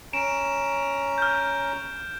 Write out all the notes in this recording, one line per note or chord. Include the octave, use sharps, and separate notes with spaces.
C#4 A#5 D7 E7
F6 G6